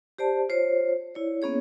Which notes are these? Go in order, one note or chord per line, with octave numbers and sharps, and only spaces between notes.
G4 C5 D5 A5
F4 C5 C#5
E4 C#5 D5
A#3 B3 C#4 G#4 C#5